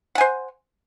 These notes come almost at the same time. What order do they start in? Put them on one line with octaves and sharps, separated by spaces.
F#5 G#5 C5